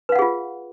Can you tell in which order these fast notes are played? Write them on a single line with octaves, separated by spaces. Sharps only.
B4 F5 F#5 G#4 F4